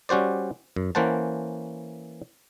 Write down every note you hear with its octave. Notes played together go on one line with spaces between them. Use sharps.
G3 C#4 F#4 C5 D5
F#2
E3 A#3 C#4 C5 F#5 A5